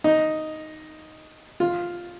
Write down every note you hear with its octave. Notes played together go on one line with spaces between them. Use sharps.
D#4
F4